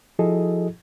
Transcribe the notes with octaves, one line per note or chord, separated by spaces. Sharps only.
F3 E4 F#4 G#4 A4 D#5